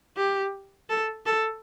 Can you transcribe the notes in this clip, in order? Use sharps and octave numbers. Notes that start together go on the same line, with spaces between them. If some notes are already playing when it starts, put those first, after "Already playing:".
G4
A4
A4